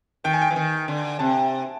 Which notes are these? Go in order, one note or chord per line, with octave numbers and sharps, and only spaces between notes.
D#3 G5
G#5
G5
E3
D#3
D3
C3 A5